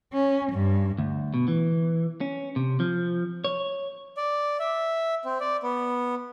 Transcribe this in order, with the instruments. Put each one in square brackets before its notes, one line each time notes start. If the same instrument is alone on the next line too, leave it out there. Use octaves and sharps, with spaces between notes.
[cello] C#4
G2
[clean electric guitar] D2
B2
E3
C#4
C3
F3
C#5
[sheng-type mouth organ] D5
E5
C4
D5
B3